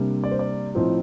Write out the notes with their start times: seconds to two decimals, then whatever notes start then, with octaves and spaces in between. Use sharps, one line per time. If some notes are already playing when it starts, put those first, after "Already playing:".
Already playing: C3 G3 A#3 D4
0.24 D5
0.31 C5
0.39 D5
0.75 A2 F3 C4 D#4